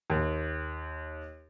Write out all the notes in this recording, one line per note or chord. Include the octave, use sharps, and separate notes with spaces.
D#2